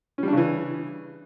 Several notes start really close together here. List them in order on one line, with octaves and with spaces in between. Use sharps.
C#4 G3 D4 C#3 E3